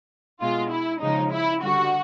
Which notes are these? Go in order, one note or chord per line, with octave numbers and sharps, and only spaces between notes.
B2 G#3 F4
E4
C#3 F3 G#3 D#4
E4
D3 G3 F#4